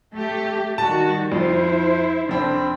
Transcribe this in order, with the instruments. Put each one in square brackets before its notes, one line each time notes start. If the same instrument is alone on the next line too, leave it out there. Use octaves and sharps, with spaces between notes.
[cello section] A3 G4
[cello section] D#3 G3 F#4 [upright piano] A5
[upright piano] F2 [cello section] E4 C5
[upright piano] F1 C4 [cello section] D4